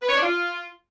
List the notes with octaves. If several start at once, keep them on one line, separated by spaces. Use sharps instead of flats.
B4
C#5
D4
F4